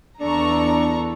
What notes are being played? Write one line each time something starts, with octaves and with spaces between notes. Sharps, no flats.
E2 D4 A4 A#5 C#6